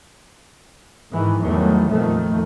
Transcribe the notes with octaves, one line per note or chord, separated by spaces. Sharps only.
G#2 D#3 E3
E2 D#3 E3 F#3 G3 A3
F2 A#2 D#3 F3 A3